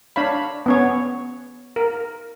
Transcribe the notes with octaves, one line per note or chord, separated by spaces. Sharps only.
D4 C#5 F5 B5
B3 C#4 C#5
A#4